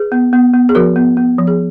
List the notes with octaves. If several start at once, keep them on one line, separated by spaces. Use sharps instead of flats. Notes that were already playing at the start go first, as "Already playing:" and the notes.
Already playing: G#4 B4
B3
B3
B3
G#4
F3 F#4 A#4
B3
B3
F3
G#4